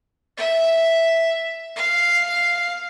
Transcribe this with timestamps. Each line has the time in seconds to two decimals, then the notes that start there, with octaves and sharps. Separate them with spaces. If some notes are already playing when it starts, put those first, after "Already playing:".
0.37 E5
1.76 F5